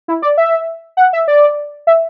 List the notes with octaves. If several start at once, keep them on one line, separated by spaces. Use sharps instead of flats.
E4
D5
E5
F#5
E5
D5
E5